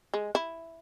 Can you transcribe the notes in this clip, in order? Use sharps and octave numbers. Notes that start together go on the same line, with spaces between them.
G#3
E4